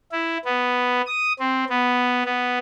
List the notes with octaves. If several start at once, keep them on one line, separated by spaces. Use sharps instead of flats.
E4
B3
D#6
C4
B3
B3